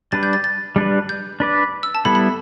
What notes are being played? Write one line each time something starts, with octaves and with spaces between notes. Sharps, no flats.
G3 D4 B4 A6
G6
A6
A6
G3 D4 B4
G6
D4 B4 D5
E6
A5
G3 B3 E4 A4 B5
B5